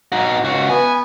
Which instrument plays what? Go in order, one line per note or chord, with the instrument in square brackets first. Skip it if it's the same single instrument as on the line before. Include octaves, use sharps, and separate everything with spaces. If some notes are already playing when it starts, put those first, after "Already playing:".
[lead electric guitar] D#4 F#4
C#2 F#4
[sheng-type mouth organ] B3 B4 [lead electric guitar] G#5